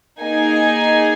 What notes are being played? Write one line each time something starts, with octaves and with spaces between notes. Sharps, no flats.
A#3 D#4 G#4 G#5